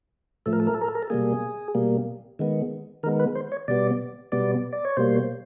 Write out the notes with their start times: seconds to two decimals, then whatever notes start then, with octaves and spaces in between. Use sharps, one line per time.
0.46 A2 F3 A3 A4
0.53 A#4
0.60 A4
0.67 A#4
0.74 A4
0.81 A#4
0.88 A4
0.95 A#4
1.03 A4
1.10 B2 G3 A#3 G#4
1.75 B2 G3 A#3
2.39 D#3 G#3 B3
3.03 D#3 A#4
3.06 G#3 B3
3.19 B4
3.35 C5
3.52 C#5
3.68 B2 G3 B3 D5
4.32 B2 G3 B3 D5
4.73 D5
4.85 C#5
4.97 B2 G3 A#3 C5